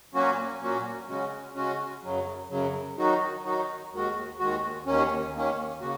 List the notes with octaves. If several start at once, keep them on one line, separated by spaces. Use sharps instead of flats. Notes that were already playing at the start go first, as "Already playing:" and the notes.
A#2 F#3 A#3 C#4 F#4
A#2 F#3 A#3 C#4 F#4
C#3 G#3 C#4 F#4
C#3 G#3 C#4 F#4
F#2 C#3 F#3
F#2 C#3 F#3
D#3 F#3 D#4 F#4
D#3 F#3 D#4 F#4
D#2 D#3 G#3 F#4
D#2 D#3 G#3 F#4
D#2 D#3 A#3 C#4
D#2 D#3 A#3 C#4
C#3 A#3 F#4